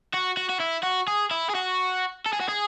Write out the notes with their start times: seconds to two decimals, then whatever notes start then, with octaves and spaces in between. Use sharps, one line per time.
0.14 F#4
0.37 F#4
0.50 F#4
0.60 E4
0.83 F#4
1.08 G#4
1.31 E4
1.50 G#4
1.55 F#4
2.26 A4
2.33 G#4
2.40 F#4
2.48 G#4